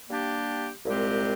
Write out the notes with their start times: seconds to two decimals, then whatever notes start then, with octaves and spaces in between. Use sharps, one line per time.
0.09 G3 A#3 D4 G4
0.85 C2 A#2 G#3 C4 G4